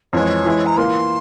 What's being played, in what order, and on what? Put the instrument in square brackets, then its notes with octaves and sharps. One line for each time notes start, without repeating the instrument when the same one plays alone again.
[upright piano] F2 E3 G#3 [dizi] C#5
[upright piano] E3 G#3 E4
[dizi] A#5
[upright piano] E3 A#3 F4 [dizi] C6